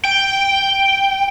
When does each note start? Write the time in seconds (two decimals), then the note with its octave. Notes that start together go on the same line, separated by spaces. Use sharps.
0.05 G5